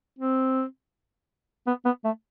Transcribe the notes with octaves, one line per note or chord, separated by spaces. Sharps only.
C4
B3
B3
A3